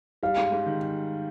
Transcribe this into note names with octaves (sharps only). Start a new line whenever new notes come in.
G3 F5
G#2
G#2
D#3